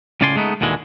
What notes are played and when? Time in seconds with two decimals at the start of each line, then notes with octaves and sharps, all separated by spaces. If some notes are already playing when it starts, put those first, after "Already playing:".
0.21 C#2 A2 C#3 D5 G#5 C6
0.36 G#3 A3 B3 D#4
0.61 D#2 A#2 D3 E3 G#3